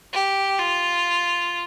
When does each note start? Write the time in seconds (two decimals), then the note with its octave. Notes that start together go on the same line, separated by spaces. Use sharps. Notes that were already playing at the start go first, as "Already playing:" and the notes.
0.13 G4
0.59 F4